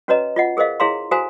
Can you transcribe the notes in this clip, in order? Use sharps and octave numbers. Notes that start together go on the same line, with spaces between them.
C#4 F#4 B4 C#5 D#5 A#5
F4 D#5 F#5
G#4 A#4 C5 D#5 F5
E4 G#4 C#5 F5 A#5 C6
F#4 A4 C5 F5 G#5 A#5